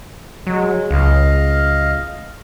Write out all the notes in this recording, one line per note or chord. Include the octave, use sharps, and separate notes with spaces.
F#3 G#3
C#2 D#5 F5